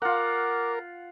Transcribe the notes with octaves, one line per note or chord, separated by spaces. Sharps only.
F4 A#4 F#5 D6